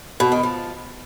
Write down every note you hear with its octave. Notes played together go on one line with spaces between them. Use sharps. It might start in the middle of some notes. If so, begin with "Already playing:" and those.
B2
D#3
F3